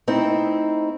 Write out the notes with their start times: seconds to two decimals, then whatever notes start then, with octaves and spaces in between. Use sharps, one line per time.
0.07 A3 C4 D#4 E4